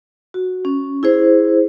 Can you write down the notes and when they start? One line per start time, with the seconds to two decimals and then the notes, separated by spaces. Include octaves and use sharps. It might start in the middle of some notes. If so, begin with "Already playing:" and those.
0.34 F#4
0.65 C#4
1.03 E4 G#4 C5